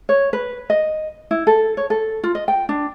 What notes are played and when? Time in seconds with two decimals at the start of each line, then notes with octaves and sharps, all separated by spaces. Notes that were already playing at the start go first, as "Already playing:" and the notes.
0.09 C#5
0.33 B4
0.70 D#5
1.31 E4
1.47 A4
1.77 C#5
1.90 A4
2.24 F4
2.35 D#5
2.48 G5
2.69 D4